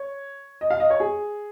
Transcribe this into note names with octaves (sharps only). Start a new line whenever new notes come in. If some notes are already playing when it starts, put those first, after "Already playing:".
Already playing: C#5
D#5
F5
D#5
C#5
G#4